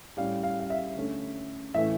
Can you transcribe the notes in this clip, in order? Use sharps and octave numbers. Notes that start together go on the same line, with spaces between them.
A2 G3 C#4 F5
F5
F5
E5
D3 A3 C#4
A2 E3 A3 C#4 E5